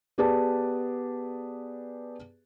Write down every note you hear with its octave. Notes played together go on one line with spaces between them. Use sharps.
B3 G4 G#4 B4 D5 A5